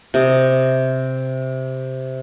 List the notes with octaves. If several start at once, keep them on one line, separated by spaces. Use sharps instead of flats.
C3 D#5